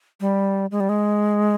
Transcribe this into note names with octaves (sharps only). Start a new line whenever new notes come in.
G3
G#3
G3
G#3